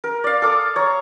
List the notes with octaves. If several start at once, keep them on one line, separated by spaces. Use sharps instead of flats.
A#4
D5 F5
A4 F5 D6 D#6
C#5 A#5